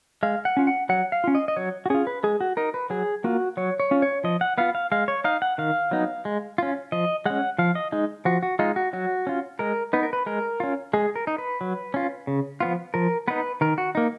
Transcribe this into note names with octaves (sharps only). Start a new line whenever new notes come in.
G#3 F5
F#5
C#4 F4
F#5
F#3 F#5
F5
C#4 F4
D#5
D#5
F#3 C#5
F#4
C#4 F4 G#4
B4
G#3 G#4
F#4
D#4 A#4
B4
F#3 G#4
A#3 F4 F#4
F#3 C#5
C#5
C#4 F4
C#5
F3 D#5
F#5
B3 F4 F5
F5
G#3 F5
C#5
D#4 F5
F#5
D#3 F5
F#3 B3 D#4
G#3
C#4 F4
F3 D#5
G#3 C#4 F#5
F3 F5
D#5
G#3 D#4
F3 F#4
F#4
G#3 D#4 F4
F#4
F#3 F#4
C#4 F4
G#3 A#4
B3 D#4 B4
A#4
B4
G#3 A#4
C#4 F4
G#3 G#4
A#4
D#4
B4
F#3
C#4 F4
C#3
F3 B3 F4
F3 A#4
B3 D#4 B4
D#3 A#4
F#4
A#3 D#4